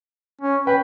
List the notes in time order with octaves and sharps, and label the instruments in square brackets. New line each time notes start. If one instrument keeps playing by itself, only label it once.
[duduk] C#4
[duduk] B4 [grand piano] G5